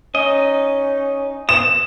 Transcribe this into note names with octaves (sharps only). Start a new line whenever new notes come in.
C#4 D#4 D#5
D#6 E7